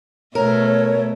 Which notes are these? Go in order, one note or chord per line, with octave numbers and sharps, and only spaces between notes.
B2 A3 A#4 C#5